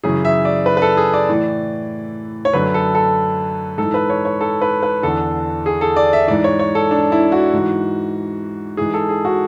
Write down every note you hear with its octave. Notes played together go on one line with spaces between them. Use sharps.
F#2 C#3 E3 G#4
E5
D5
B4
B4
A4
G#4
D5
A2 E3
C#5
F#2 D3 B4
A4
A4
G#2 E3 A4
B4
C#5
C#5
A4
B4
B4
E2 D3 A4
G#4
A4
D5
E5
G#2 E3 D5
C#5
C#5
A4
D4
E4
F#4
G#2 E3
G#2 E3 G#4
A4
G#4
F#4